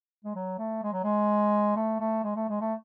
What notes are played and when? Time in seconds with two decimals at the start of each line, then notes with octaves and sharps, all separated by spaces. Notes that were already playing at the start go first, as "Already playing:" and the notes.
0.25 G#3
0.35 F#3
0.58 A3
0.83 G#3
0.93 F#3
1.03 G#3
1.76 A3
2.00 A3
2.23 G#3
2.36 A3
2.49 G#3
2.61 A3